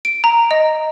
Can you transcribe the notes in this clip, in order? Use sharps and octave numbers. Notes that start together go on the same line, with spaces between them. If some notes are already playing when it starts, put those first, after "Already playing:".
D7
A#5
D#5